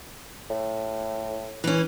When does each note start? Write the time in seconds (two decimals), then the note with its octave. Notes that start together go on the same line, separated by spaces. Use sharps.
0.50 A2
1.64 E3 C#4